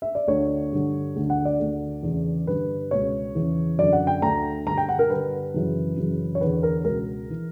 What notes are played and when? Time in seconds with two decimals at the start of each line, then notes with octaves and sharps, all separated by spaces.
0.02 E5
0.15 D5
0.28 D2 D3 C#5
0.72 G2 D3
1.16 D2 D3
1.30 F#5
1.45 D5
1.60 D2 D3
2.03 E2 C#3 E3
2.47 G2 D3 B4
2.91 C#2 B2 C#5
3.35 E2 C#3 E3
3.78 F#2 D3 D5
3.93 F#5
4.07 G5
4.22 D2 D3 A#5
4.66 G2 D3 A#5
4.78 G5
4.89 F#5
4.99 A#4
5.10 G2 D3 B4
5.54 F#2 C#3 E3
5.97 F#2 C#3 E3
6.35 C#5
6.41 E2 D3 B4
6.63 A#4
6.85 C#2 B2 A#4
7.30 E3